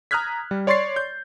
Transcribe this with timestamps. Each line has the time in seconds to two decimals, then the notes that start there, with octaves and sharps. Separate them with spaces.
0.11 A#5 D#6 F6 F#6 G#6 B6
0.51 G3
0.67 C#5 D5 C6 C#6 A6 C7
0.96 G6